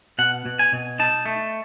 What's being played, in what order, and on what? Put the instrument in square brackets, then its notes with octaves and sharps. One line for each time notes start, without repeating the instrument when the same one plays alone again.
[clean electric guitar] B2 F#5
B2
G#5
B2
D#4 A5
A3